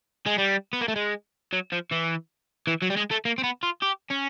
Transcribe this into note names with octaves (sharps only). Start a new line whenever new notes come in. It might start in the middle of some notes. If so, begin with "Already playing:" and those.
G#3
G3
B3
A#3
A3
G#3
F#3
F3
E3
E3
F#3
G3
G#3
A3
A#3
C4
B3
F4
G4
C#4